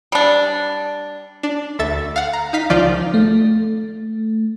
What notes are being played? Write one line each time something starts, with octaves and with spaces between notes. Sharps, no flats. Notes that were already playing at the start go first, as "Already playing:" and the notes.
G3 D4
D4
D2 A4 E5 A6
F5 F#5
A#5
D#4 F5 B6
C#2 D#3 F3 D#4 F4 D5
A3